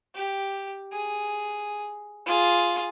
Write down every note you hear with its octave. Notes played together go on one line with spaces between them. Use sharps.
G4
G#4
F4 G#4